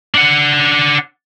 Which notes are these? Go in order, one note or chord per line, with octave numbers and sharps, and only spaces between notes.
D4 F#5